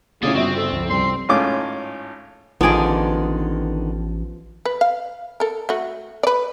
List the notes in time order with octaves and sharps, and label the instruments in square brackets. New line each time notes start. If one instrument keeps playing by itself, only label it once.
[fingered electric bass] C#3 B3 [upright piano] A3 C#4 E4 [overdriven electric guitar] F4 D5 [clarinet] G#4
[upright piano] G1 E5 [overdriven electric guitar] C4 [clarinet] F#4
[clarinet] A4
[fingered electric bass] C#2 F3
[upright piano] C2 [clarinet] C6
[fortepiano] G#1 A2 C#4 F4 D6
[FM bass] A1 [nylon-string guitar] D3 D#3 [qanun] F3 D5 [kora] B3 G#4
[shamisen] B4
F5
A4 A#4
A3 F#4
B4 D5